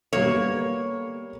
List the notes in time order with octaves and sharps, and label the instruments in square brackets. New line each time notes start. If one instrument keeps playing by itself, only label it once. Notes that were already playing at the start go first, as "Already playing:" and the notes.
[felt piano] G3 B3 A4 [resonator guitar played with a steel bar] A#3 C#5